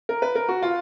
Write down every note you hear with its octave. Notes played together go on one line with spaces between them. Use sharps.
A#4
B4
A#4
F#4
F4